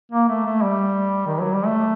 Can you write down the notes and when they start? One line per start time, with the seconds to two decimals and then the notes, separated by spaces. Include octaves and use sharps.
0.12 A#3
0.29 A3
0.46 A3
0.63 G3
1.27 D#3
1.40 F#3
1.53 G3
1.66 A3